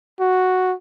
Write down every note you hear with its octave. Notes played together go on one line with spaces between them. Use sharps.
F#4